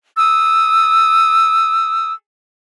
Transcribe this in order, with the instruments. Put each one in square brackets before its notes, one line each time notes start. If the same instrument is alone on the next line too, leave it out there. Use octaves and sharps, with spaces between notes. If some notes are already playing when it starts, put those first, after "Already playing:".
[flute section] D#6 E6